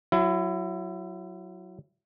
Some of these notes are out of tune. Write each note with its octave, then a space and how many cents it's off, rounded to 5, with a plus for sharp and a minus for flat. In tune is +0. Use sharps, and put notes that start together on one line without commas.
F#3 +0 E4 +25